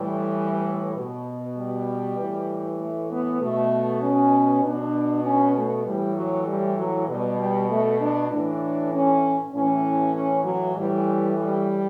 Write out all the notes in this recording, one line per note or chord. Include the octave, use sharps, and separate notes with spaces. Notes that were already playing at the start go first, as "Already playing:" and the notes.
Already playing: A2 E3 G3
B2
G3
A2 E3
A3
B3
B2 A3
C#4
B2 D4
C#4
A3
A2 E3 G3
F#3
G3
F#3
B2 G3
G3
A3
D4
A2 E3 D4
C#4
A2 E3 C#4
C#4
F#3
A2 E3 G3
G3